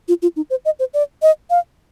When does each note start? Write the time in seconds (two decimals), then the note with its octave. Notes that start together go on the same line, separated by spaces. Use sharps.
0.08 F4
0.22 F4
0.36 D#4
0.50 C5
0.65 D#5
0.79 C5
0.94 D5
1.22 D#5
1.50 F5